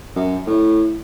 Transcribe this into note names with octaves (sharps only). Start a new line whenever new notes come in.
F#2
A2